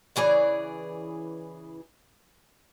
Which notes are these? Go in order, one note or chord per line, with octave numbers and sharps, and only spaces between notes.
C#3 E3 G#4 D5